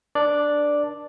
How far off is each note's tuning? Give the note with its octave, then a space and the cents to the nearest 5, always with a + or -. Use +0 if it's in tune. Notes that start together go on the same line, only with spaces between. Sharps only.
D4 +0 A#4 +45 D5 +0